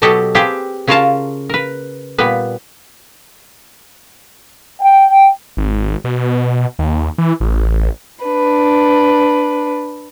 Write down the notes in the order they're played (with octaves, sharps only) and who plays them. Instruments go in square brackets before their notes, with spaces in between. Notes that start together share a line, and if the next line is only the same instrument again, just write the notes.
[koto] B2 F#3 B3 G4 A4 D#5
C4 G4 G#4 B4 A5
C#3 C#4 F4 A#4 F5 A5
A#4 B4
A#2 G3 B3 B4
[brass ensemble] G5
[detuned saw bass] G#1
B2
D#2
E3
A1
[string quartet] D4 B4